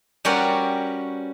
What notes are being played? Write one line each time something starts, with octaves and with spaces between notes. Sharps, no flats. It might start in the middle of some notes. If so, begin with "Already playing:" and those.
G3 C#4 F#4 A#4 B4 D5